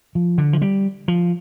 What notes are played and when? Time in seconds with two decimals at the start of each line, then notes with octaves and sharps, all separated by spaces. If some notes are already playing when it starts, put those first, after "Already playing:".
0.15 F3
0.38 D3
0.53 F3
0.62 G3
1.08 F3